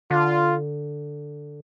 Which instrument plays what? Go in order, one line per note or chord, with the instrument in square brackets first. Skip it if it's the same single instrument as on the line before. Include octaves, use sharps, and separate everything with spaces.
[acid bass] D3 [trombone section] F4